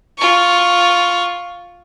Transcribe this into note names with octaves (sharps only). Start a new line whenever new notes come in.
F4 C#6